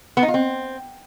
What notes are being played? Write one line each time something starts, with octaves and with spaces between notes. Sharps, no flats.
B3
D#4
F4
C4